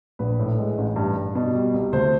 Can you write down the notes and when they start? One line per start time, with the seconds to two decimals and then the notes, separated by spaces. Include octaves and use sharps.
0.19 A#1 B4
0.39 A2
0.58 G#3
0.78 A1
0.96 G2
1.16 G2
1.35 B2
1.55 G3
1.74 C2
1.93 D2 C5